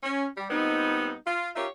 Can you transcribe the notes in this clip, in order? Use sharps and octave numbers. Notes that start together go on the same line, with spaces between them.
C#4
G3
A#2 G3 B3 C4 D#4
F4
D#4 F4 G4 A#4 C#5 E5